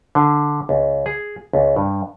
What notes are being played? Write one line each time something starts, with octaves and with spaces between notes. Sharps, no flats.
D3
C#2
G#4
C#2
G2